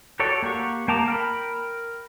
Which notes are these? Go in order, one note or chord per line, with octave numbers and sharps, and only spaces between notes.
F#4 G4 A4 C#5 D5
A#3 G4 F#5 C#6
A#3 G5 A5 A#5 D6
A#4 G5 B5